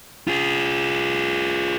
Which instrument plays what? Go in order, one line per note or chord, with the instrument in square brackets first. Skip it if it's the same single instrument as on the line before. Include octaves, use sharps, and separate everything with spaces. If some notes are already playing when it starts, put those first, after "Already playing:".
[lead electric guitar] F4 G#4